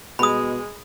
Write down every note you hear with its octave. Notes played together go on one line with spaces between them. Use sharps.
B2 G#3 B5 D#6